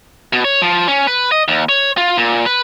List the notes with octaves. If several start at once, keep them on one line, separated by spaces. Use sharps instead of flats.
B2
C#5
F3
C#4
B4
D#5
D#2
C#5
F4
A#2
B4